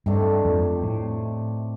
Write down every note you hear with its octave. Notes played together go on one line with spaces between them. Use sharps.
G2 C3 D#3 A3 D4
F2
A2